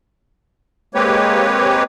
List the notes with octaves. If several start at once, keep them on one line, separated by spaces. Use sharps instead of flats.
G#3 A#3 C4 G4 B4 C#5